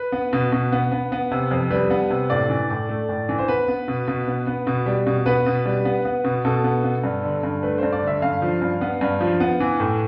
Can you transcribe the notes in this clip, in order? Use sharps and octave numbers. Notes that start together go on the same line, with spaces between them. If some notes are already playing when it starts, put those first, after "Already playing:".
Already playing: B4
B3
B2
B2
B3
B3
B3
C3
F2
G3 B4
B3
C3
A2 D5
E3
A2
A3
A2
E3
C5
B3 B4
B3
B2
B2
B3
B3
B2
G3
B2
B3 B4
B2
G3
B3
B3
B2
B2 A4
B3
B3
G2
D3
G2
A3 B4
G2 C5
D5
D3 E5
G2 F5
F3
G2
B3
G2
F3
B3
E3
A2